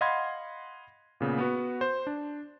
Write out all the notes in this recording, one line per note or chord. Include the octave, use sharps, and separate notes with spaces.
D#5 F5 F#5 B5 C6 G#6
A#2 C#3 B3
B3 F#4 B4
C5
D4